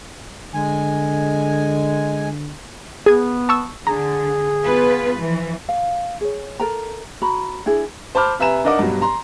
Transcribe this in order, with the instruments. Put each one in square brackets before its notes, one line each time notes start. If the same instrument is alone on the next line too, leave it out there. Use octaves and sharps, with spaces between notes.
[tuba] D3 [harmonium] G#3 G#5
[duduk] B3 [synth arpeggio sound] G#4 G#6
[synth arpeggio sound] A5 C#6 E6
[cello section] D3 [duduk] G#4 [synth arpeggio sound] A#5
[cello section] B3 F4 B4
E3 F3
[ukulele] F5
G#4 C#5
A4 A#4 A#5
F#4 A#5 B5
D4 E4 G#4
[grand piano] C5 A5 B5 D6 F6
C3 B4 E5 G#5 A#5 E7
D4 D#4 A#4 D#5 F#5 D6
G2 B2 F#3
A#5 C6